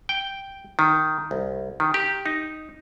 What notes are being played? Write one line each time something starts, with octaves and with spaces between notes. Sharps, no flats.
G5
D#3
C2
D#3
G4
D#4